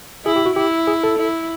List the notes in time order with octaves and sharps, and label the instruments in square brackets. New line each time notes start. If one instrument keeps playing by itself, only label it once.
[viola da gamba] E4 [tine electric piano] G#4
[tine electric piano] G4
F#4
[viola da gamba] E4 [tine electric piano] G4
[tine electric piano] G#4
A4
[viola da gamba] E4